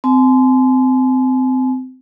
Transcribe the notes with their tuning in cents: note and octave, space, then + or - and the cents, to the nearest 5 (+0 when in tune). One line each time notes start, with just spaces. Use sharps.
C4 -25 G#5 +40